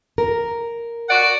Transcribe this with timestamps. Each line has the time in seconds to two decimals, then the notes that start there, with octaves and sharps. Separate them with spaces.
0.18 A#4
1.09 F#4 D5 F#5